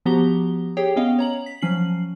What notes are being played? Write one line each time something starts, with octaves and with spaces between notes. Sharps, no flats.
F3 B3 F#4 G4 A#5 G7
G4 G#4 C#5 G5
B3 C#4 D#5 F5 G5
C#5 A#5 F#7
B6
F3 F#3 C#4 C7 F#7